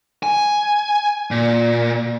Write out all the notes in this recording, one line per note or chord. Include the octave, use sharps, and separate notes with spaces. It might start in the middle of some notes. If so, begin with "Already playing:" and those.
G#5
A#2